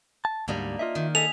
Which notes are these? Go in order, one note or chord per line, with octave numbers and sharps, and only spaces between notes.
A5
D2 G#2 G3 A#3 D4 D#4
F4 D#5 E5
D#3
G#4 A4 D#5 E5 F7